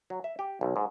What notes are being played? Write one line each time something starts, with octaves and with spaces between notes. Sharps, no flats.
F#3
E5
G4
B1
G#2